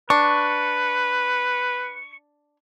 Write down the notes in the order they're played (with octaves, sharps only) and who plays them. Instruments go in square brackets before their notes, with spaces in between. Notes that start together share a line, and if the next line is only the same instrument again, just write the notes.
[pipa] D4 [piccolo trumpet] B4 [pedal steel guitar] C#6